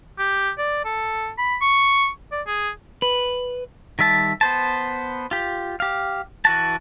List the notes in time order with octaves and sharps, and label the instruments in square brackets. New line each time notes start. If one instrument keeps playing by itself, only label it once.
[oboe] G4
D5
A4
B5
C#6
D5
G#4
[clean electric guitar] B4
[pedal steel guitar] D#3 G3 E5 A5
B3 C5 A5
F4 G4
G4 F5
E3 F#4 A5